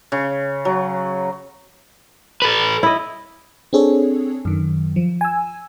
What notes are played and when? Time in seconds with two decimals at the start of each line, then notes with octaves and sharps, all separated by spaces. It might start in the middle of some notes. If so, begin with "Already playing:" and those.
0.12 C#3
0.65 F#3
2.42 A4 B4
2.83 E4 D#5
3.73 C4 D4 G#4 A4 C#5
4.45 F#2 D#3
4.96 F3
5.21 G#5 E6